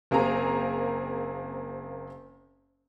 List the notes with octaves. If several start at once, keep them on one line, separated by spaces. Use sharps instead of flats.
F#1 A#3 C4 G#4 A#5